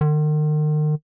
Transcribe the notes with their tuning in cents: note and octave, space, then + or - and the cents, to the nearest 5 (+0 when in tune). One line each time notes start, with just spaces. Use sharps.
D#3 -40